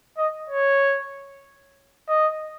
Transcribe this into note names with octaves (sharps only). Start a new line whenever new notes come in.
D#5
C#5
D#5